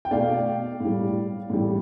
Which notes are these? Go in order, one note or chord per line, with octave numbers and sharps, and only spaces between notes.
G5
B2 A3 D5 F5
A2
G3
A2 E3 G3